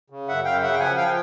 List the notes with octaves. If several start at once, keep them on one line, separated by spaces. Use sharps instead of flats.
C#3
F#2 E5 F#5
F#2 F5 G5
C#3 E5 F#5
G5
F3 F#5 G#5
F3 F5 G5